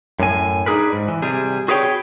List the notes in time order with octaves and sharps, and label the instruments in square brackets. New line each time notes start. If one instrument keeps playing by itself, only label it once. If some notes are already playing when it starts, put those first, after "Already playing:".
[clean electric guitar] F#2 A2 G#5
D4 D#4 G#4 A#4 B4
G#2
E3
C3 G3 G#4
F#4 G#4 B4 C#5 F#5 G5